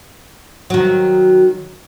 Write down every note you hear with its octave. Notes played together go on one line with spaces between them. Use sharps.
D#3 F#3